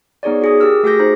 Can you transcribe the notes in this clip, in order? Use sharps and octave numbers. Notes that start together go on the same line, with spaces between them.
B3 D#4 G#4 C#5 D5
F#4 G#4 D#6
G4 A#4 D6 E6 F6
A3 F#4 G#4 D6 G6 A#6
D#4 C5